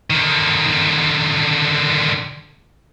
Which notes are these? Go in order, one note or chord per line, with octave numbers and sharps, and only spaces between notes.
D3 D#3